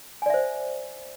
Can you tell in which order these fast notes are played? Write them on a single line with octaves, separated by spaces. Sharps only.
G#5 D5 E5 C5